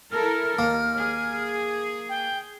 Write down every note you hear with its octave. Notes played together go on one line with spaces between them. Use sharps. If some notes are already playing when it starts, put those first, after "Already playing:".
E4 A4 A#4 F6
D#2 A#3
G#4
G5